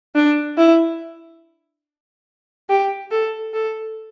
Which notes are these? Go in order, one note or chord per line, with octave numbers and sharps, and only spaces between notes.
D4
E4
G4
A4
A4